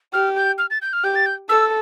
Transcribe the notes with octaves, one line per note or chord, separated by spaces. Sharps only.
G4 F6
G6
F6
A6
G6
F6
G4 G6
A6
G6
A4 E6